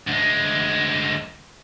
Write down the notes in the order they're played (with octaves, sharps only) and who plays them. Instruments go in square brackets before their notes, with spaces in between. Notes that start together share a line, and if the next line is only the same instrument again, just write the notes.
[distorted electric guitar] D2 G#3